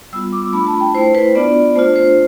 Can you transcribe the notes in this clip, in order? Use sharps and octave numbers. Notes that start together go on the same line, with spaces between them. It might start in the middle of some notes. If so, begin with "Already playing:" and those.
G3 B3 F4 E6
D6
A3 D4 F4 B5
A5
G5
A3 E4 C5
B4
B3 D4 F4 D5
A3 D4 F4 C5
C5